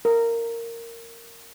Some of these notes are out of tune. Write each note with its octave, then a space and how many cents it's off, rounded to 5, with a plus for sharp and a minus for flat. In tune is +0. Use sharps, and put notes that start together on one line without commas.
A#4 -10